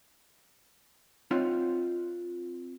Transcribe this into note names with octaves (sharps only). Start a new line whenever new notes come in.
C4 D#4 F4 C#5 F#5